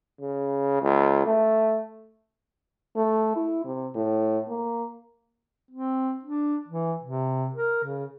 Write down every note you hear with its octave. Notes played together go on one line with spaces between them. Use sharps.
C#3
C#2
A3
A3
E4
C3
A2
A#3
C4
D4
E3
C3
A#4
C#3